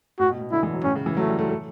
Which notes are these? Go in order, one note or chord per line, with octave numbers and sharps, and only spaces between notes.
A2 F#4
B2
B2
D3 E4
E3
F#3
A2 C#4
C#3
E3
F#3 A3
G3
A3
A3